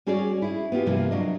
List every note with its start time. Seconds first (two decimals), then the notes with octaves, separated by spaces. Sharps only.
0.07 G3 C#4 F#4 G#4 C#5 D5
0.42 E4 G#4
0.72 B3 C4 F4 G4
0.86 G2 C3 E3 F3 A#3
1.11 F#3 D4 D#5